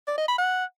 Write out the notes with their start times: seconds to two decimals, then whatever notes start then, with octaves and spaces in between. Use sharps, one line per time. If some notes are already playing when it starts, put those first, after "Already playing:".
0.08 D5
0.18 D#5
0.28 B5
0.38 F#5